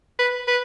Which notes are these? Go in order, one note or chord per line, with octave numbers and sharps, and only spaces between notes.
B4
B4